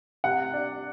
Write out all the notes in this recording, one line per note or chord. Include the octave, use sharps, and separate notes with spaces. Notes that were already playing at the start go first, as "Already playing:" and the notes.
C3 F#5
D4